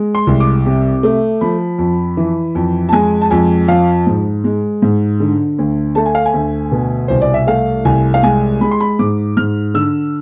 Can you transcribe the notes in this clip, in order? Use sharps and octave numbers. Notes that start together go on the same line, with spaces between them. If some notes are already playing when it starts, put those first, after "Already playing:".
Already playing: G#3
C6
C2
D6
C3
A3
F3 B5
F2
E3
F2
A5
G#3 G#5
A5
F2 G#5
F3 F5
G#2
G#3
G#2
D3
D2
A3 A5
G#5
F5
G#5
D2
B2
C2 C5
D5
E5
A3 F5
C2 G#5
F5
G#3 G#5
G#3 B5
C6
B5
G#2 D6
G#2 F6
D3 E6